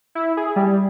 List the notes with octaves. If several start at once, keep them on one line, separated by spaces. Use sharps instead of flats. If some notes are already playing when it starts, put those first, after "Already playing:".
E4
G#4
G3